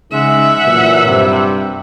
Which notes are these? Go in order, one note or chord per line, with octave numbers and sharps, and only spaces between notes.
C#3 G#3 D#4 E5 F#5
A#2 E3 F#3
G2 C3